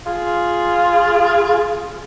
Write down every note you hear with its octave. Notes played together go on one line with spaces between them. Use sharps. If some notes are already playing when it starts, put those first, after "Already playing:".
F4 G#4